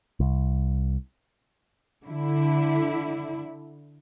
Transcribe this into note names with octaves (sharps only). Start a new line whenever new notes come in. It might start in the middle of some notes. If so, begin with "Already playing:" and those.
C2
D3 E4